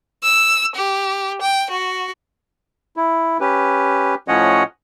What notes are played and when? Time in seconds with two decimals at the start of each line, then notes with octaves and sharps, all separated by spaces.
0.23 E6
0.75 G4
1.42 G5
1.70 F#4
2.97 E4
3.40 C#4 G4 B4
4.28 A2 F3 C#4 C#5 D#5 F#5